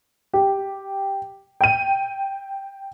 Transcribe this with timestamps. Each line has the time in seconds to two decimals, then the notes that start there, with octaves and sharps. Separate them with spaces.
0.33 G4
1.61 G5 D#7